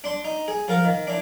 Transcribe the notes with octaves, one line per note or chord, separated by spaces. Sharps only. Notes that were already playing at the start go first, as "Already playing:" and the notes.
D4 C6
D#4
G#4
F3 A#4 F5
D#3
E3 D4